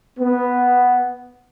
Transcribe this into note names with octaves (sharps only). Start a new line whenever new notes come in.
B3